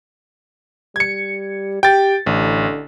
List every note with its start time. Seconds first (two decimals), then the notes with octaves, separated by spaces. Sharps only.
0.96 G3 G#6 C#7
1.83 G4 G5 A6
2.26 A1 D3